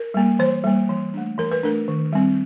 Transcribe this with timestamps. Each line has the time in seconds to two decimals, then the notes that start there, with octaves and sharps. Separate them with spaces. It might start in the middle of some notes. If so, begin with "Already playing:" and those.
Already playing: A#4
0.14 G3 A#3
0.39 E3 C5
0.64 G3 A#3
0.89 E3
1.14 A3 D4
1.38 E3 A#4
1.51 B4
1.63 A3 D4 A#4
1.88 D#3
2.13 G3 C4